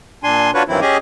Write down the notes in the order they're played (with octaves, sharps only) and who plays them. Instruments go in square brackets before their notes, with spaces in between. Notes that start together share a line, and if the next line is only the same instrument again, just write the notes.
[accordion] A#2 D4 G#5 C6
D4 F4 F#4 B4 C#5
G2 D#3 E3 F#3 C4 E4
C#4 G4 G#4 D#5 G#5